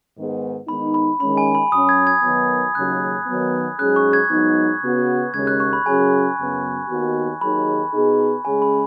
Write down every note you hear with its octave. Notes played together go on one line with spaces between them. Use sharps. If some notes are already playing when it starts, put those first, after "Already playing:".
G#2 D#3 B3 G#4
D#3 G#3 B3 D#4 B5
B5
D#3 G#3 C#4 B5
G#5
B5
F#2 F#3 C#4 D#6
G#6
G#6
D#3 F#3 B3
D#2 C#3 F#3 F#6
D#3 F#3 B3
G#2 F#3 C#4 G#4 F#6
C#6
G#6
G#2 F#3 B3 D#4
C#3 B3 F#4
D#2 C#3 G#3 G#6
F#6
C#6
B5
F#2 C#3 F#3 C#4 G#4 G#5
F#2 C#3 B3
D#2 D#3 B3 D#4 F#4
D#2 D#3 F#3 D#4 G#4 B5
B2 B3 D#4 G#4
C#3 G#3 C#4 G#4 G#5
B5